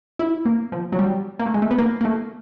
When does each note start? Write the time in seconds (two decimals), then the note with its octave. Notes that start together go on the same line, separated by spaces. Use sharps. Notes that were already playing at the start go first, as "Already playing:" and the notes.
0.19 E4
0.45 A#3
0.72 F3
0.92 F#3
0.99 G3
1.39 A#3
1.46 A3
1.54 G#3
1.62 A3
1.71 B3
1.78 A#3
2.01 A#3
2.05 A3